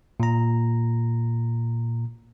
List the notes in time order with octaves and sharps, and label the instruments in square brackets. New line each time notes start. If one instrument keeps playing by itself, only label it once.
[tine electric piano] A#2 A#5